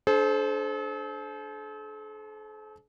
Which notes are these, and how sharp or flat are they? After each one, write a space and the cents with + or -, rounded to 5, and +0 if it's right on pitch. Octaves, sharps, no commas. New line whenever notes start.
D4 +0 A4 -45 C5 +0